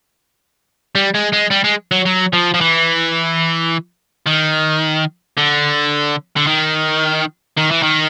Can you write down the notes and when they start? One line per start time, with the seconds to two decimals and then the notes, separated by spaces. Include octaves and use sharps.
0.95 G3
1.14 G#3
1.32 G#3
1.50 G3
1.64 G#3
1.91 F#3
2.06 F#3
2.33 F3
2.54 F3
2.61 E3
4.26 D#3
5.37 D3
6.36 D3
6.47 D#3
7.57 D#3
7.71 E3
7.83 D#3